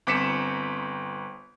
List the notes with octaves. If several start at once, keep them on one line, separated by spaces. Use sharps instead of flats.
G1 C4 D6 B6 C#7 E7